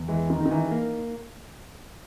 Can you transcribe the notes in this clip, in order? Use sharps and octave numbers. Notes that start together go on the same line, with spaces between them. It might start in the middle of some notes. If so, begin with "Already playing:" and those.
Already playing: E2
E3 G#3
D#3
D#3 D#4
E3
A#3